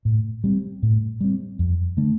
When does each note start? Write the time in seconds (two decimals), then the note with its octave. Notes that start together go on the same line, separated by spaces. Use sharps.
0.05 A2
0.44 G3 C4
0.83 A2
1.21 G3 C4
1.59 F2
1.97 D3 A3 D4